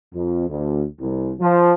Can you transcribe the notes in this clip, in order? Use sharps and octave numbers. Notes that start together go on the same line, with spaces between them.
F2
D2
C2
F3